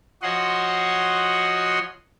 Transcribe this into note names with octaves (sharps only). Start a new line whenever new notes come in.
F3 F#4 C#5 D#5 F#5 C6